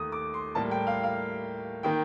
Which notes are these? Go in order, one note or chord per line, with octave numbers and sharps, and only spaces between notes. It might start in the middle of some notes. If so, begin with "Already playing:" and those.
Already playing: D#2 D#3 A3 D#6
D6
C6
A2 G3 A#3 A5
G5
F5
F5
D#3 A#3 G5